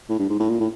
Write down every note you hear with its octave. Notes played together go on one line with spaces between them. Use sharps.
A2
G2
G#2
A2
A#2
A2